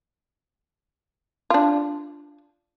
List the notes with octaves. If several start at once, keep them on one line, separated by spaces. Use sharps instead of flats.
D4 F4